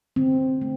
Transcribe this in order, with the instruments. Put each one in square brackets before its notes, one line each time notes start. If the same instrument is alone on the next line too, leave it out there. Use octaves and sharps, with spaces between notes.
[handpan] D3 C4
A3